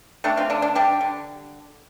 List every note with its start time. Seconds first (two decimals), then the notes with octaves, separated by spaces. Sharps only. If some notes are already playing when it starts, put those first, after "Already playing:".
0.24 A3 D4 G4
0.37 C4 F4
0.50 D3 D4
0.62 D4
0.75 G3 D4 G4
1.01 D3